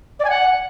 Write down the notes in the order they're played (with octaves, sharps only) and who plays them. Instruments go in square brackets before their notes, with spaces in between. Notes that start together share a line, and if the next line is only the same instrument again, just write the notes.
[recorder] D5
G#5
F#5